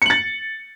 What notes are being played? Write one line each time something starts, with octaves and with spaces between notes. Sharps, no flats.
A6 C#7 F#7